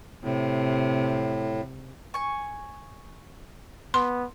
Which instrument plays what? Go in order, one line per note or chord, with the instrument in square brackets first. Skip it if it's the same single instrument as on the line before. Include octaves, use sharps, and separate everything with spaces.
[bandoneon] A2 [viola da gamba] C3
[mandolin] G#5 C#6
[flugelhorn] B3 [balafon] C6